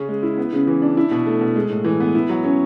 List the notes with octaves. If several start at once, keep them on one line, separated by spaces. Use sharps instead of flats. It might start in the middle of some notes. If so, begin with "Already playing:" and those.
Already playing: C#3 C#4
G#3
E4
B3
C#3
E3
D4
E4
B2
A3
B2
G#3
A2
E3
B3
E4
F#3
C#4